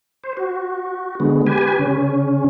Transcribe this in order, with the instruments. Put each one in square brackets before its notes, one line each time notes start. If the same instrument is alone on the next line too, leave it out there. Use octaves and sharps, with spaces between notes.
[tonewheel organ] C5
F#4
D3 G#3 B3
G4 B4 G#5
C#3 C#4